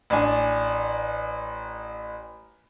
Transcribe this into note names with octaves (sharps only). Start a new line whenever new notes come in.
A1 D4 G#5